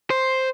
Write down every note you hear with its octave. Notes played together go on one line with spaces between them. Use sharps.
C5